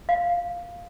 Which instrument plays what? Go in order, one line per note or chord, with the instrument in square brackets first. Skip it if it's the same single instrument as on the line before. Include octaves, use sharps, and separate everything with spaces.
[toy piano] F5